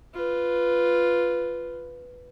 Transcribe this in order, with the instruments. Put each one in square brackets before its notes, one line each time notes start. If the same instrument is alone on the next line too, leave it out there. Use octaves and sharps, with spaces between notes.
[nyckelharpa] F4 B4